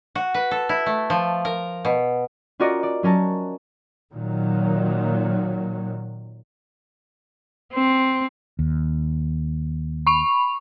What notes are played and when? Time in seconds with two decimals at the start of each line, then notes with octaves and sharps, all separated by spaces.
0.15 F#4
0.34 B4
0.51 A4
0.69 E4
0.86 A3
1.10 F3
1.45 A#4
1.85 B2
2.60 C#4 F4 F#4 A#4 D5 D#5
2.83 D5
3.03 F#3 C#4 A#4 A5
4.12 A#2 D#3 F#3
7.73 C4
8.59 D#2
10.07 B5 C#6 F7